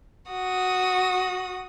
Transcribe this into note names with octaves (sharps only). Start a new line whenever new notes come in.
F#4 D#6